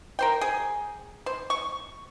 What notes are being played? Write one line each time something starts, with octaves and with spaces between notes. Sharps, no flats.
A#4 C5 G5
G#4
C5
C#6